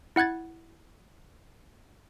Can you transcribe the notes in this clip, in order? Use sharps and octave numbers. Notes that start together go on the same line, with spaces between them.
E4 F#5 F#6 G#6 A6